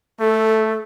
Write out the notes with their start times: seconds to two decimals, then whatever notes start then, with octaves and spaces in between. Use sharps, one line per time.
0.20 A3 A4